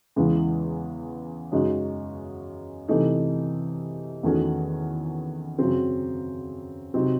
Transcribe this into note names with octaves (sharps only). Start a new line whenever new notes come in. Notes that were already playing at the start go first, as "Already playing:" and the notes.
E2 C#3 E3 G#3
F#2 C#3 G#3 D#4 F#4
C3 E3 A3 D#4
E2 D#3 A3 C#4 F#4
F#2 C#3 F#3 C4
C3 F#3 C4 D#4